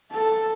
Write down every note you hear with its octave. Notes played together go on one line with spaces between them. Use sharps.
A4